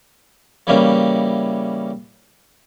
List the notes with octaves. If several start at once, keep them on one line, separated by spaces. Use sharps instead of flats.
C#3 E3 G3 A#3 C#4